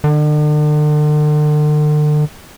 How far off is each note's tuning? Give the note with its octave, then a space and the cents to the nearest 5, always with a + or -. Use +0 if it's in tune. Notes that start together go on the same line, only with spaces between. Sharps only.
D3 +40